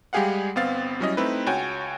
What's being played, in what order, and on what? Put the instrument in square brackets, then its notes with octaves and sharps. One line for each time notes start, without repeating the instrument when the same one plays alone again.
[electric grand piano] G3 G#3 G4 G#4 F5 F#5
G1 B3 C4 F5 A6
F#3 G3 C#4 E4 D#5
A3 C4 D#4 E4 B4
C#2 F#4 C#5 G5 G#5